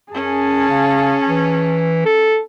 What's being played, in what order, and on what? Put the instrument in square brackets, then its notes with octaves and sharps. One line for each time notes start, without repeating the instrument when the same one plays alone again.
[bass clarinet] F#2 [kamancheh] C#4 [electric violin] G#4 A5
[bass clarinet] C#3
E3
A4